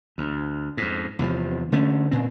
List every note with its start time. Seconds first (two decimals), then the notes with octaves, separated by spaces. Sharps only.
0.18 D2
0.77 F2 G#2
1.19 E2 C3 E3 F3
1.72 D3 A3 C#4
2.11 A#2 C4